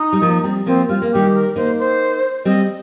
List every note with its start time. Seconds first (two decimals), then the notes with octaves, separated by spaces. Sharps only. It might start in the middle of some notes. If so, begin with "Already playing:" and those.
Already playing: D#4
0.13 G3
0.21 F3 A#3
0.44 G3 C4
0.66 F3 A#3 C4
0.89 G3 F4
1.02 A#3
1.12 D#3 G3 G4
1.34 A#4
1.56 A#3 D#4 C5
1.79 C5
2.45 G3 C4 D#5